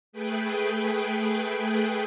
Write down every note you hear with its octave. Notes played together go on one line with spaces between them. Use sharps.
A3 G#4 B4 G5